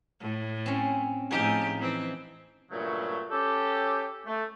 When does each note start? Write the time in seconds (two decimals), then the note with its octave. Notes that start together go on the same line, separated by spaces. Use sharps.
0.20 A2
0.66 C4 C#4
1.31 A2 F3 D#4 G4 G#4
1.79 E3 C4
2.71 G2 A#2 C#3 F#3 A3
3.30 C#4 G4 A4
4.26 A3